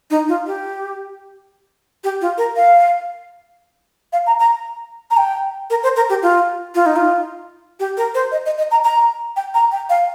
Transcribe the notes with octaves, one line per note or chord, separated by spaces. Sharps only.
D#4
F4
G4
G4
F4
A#4
F5
F5
A#5
A#5
A#5
G5
A#4
C5
A#4
G4
F4
F4
D#4
F4
G4
A#4
C5
D#5
D#5
D#5
A#5
A#5
G5
A#5
G5
F5